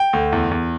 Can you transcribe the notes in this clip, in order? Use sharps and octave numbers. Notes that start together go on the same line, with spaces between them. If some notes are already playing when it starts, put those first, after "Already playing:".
Already playing: G5
D2
E2
E2